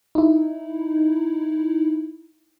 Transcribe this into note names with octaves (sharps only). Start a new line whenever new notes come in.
D#4 E4